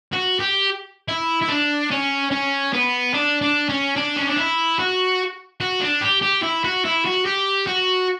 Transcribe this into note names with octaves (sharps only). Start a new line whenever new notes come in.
F#4
G4
E4
E4
D4
C#4
C#4
B3
D4
D4
C#4
D4
C#4
D4
E4
F#4
F#4
D4
G4
G4
E4
F#4
E4
F#4
G4
F#4